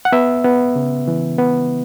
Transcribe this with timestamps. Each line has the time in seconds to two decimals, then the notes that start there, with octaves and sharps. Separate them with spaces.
0.05 F#5
0.12 B3 E5
0.44 B3
0.76 C#3
1.08 E3
1.38 B3